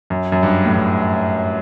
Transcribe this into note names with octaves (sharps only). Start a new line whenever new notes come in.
F#2
F#2
G2
A2
G2